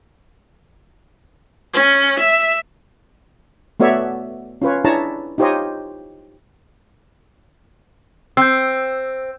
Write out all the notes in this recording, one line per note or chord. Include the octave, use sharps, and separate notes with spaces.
C#4
E5
A3 B3 F#4 C#5 D5 E5
C#4 F4 B4 C#5
D4 E4 G#4 C#5 A5 A#5
D#4 F4 G4 C5 C#5 D#5
C4 E6 G6